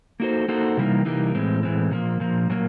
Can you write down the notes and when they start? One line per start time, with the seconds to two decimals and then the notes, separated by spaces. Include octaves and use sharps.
0.20 A#3 D#4 F#4 A4 C5
0.48 A#3 D#4 F#4 A4 C5
0.77 C3 E3 G3 A#3 D#4
1.05 C3 E3 G3 A#3 D#4
1.35 A2 E3 G#3 C4
1.63 A2 E3 G#3 C4
1.91 A#2 F3 A#3
2.20 A#2 F3 A#3
2.49 A#2 F#3 A#3